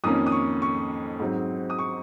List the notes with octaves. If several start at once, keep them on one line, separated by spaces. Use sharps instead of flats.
F2 D#3 A#3 C#4 D#6
D#6
C#6
C#6
G#2 F#3 C4
D#6
C#6